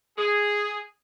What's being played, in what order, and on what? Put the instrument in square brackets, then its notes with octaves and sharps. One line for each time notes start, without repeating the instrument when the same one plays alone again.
[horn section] G#4